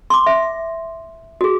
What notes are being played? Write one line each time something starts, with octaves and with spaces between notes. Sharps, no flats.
C6 D6
E5
F#4 G#4